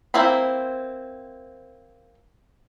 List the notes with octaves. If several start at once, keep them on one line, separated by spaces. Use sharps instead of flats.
A#3 C4 E4 C5 B5